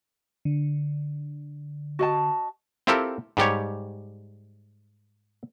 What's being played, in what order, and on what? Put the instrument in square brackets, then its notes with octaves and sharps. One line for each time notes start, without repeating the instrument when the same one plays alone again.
[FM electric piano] D3
[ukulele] F#4 D#5 A5
[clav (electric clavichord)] C4 E4 F4 G4 A4 A#4
G#2 G3 G4 C#5